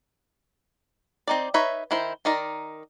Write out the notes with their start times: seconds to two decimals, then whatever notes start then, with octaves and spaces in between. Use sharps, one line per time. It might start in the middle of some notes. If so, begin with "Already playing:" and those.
1.27 C4 D#4 D5
1.54 D#4 B4 C#5 E5
1.91 D#3 E4 C5
2.25 D#3 D#4 A#4 D5